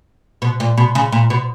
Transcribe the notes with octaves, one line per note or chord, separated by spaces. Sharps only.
B2
A#2
B2
C#3
A#2
B2